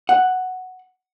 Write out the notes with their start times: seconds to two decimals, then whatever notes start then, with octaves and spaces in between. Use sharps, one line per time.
0.09 F#5